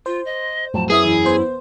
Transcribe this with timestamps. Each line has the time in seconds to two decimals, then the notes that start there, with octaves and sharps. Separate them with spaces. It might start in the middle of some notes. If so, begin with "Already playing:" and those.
0.06 F4 C5
0.25 D#5
0.74 F2 A2 F#3 A5
0.90 F#2 B3 E4 G#4 E5 D#6
1.05 E2 E4
1.25 B3 C5